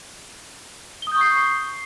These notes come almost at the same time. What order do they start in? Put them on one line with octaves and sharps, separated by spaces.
G7 D#6 G6 C#6 C7